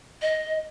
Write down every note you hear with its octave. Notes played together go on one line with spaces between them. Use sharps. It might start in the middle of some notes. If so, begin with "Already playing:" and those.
D#5